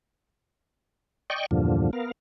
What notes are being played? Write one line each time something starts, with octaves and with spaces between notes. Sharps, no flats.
D5 D#5 G5 C#6
E2 G2 A#2 D3 F3
B3 A#4 F5